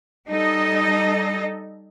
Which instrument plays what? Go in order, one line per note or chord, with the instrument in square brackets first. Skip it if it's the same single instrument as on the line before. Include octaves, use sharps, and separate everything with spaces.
[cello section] G3 D#4 A4 D#5